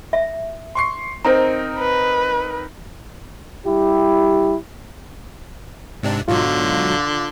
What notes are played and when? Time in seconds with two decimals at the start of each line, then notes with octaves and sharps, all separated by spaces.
0.13 E5
0.75 C6 C#6 C7
1.25 C4 D#4 A#4 C5 A#5
1.79 B4
3.65 G3 E4 G4
6.03 G#2 C3 D4
6.28 G#2 B2 D3 F#3 F4